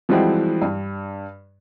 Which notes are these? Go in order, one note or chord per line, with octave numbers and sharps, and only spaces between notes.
E3 F3 G3 G#3 C4 F#4
G2